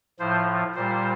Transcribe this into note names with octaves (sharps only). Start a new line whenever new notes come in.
A2 F3 C5
A#2 G3 C5